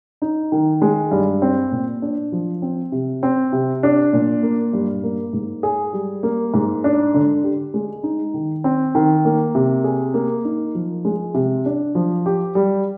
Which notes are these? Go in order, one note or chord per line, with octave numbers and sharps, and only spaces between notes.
D#4
D#3
G#3
G2
C4
A#2
D4
F3
C4
C3
C4
C3
D4
A#2
A#3
G2
A#3
G#2
G#4
G3
A#3
G#2
D4
D3
G4
G#3
D#4
D#3
C4
D#3
A#3
C3
G#4
A#3
D#4
F3
G#3
C3
D4
F3
G4
G3